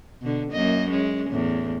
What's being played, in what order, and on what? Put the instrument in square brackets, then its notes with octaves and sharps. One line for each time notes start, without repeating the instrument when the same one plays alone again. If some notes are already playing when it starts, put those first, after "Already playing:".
[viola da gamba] B2 D3
F#2 A#3 D#5
G#3 C#4
E2 A2